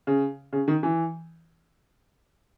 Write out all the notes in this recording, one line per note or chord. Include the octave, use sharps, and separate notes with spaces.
C#3
C#3
D#3
E3